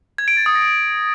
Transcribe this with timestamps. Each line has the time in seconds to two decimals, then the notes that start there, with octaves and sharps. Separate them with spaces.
0.18 G#6
0.28 D7
0.37 A6
0.46 D#6
0.55 A#6